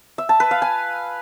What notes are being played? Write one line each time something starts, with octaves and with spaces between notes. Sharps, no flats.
E5
A5
B4
F5
G#5